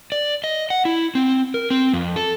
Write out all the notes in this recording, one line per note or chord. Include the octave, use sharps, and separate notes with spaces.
D5
D#5
F#5
E4
C4
A#4
C4
F2
A4